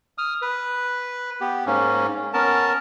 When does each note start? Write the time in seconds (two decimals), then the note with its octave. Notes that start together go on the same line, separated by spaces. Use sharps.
0.18 D#6 F6
0.42 B4
1.41 B3 G4
1.66 G#2 A#3 C#4
2.34 B3 C#4 A#4 A5